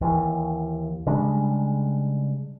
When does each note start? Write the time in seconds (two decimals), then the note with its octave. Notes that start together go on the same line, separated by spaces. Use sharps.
0.01 D#2 E3
1.06 C#3 G3 G#3 D4